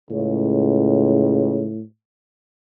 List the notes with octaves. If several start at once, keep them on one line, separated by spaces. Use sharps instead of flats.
C#2 A2 C#3